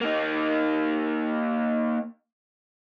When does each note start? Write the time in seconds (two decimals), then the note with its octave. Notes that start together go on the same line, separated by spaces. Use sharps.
0.01 A#3 D#4